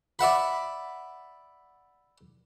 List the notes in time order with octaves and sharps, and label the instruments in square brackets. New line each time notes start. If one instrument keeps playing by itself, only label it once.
[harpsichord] D5 E5 F#5 B5